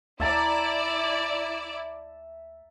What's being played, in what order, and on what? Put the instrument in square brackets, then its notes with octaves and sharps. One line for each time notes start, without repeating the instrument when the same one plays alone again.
[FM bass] D2 [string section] E4 D5 [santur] E5 A5 A#5